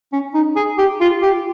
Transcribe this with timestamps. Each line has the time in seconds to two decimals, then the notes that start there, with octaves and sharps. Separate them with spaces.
0.13 C#4
0.34 D#4
0.56 G#4
0.78 G4
1.01 F4
1.22 G4